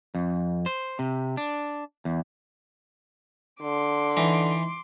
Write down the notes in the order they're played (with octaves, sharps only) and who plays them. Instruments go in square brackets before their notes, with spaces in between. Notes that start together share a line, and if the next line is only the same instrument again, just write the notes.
[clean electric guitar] F2
C5
C3
D4
E2
[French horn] D3 [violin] C6 D6
[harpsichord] E3 D#4